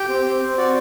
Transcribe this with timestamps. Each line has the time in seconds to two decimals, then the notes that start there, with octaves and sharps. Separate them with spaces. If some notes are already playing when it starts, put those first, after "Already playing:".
Already playing: G4 G5
0.09 C4
0.26 C4
0.41 C4
0.58 F#4 D5